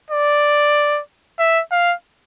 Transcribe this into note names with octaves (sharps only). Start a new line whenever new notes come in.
D5
E5
F5